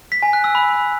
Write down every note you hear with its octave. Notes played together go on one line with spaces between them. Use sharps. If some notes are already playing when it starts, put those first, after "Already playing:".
B6
G#5
F#6
E6
B5